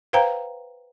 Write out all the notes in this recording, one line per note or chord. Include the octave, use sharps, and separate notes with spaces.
B4 C5 F5 G5 A#5